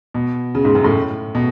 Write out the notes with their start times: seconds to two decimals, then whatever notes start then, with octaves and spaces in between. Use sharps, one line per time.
0.14 B2
0.55 C#3
0.65 G#2
0.75 F#2
0.84 A2
1.35 B2